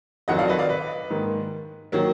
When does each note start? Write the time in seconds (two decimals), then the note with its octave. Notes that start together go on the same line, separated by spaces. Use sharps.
0.28 F2 D#3 F#3 D#5 F#5
0.39 D5 F5
0.48 B4 D#5
0.59 D5 F5
0.69 B4 D#5
1.10 G#2 D#3 A#3
1.92 D#3 F#3 A#3